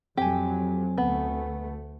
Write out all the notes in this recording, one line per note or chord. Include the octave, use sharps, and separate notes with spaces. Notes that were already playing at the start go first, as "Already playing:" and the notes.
F2 F#3 C4 G4 G#5
D2 A3 B3